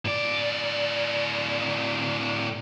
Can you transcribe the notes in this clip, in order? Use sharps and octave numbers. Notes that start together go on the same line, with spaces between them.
A2 D5